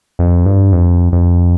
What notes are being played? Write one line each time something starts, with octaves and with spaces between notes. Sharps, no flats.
F2
G2
F2
F2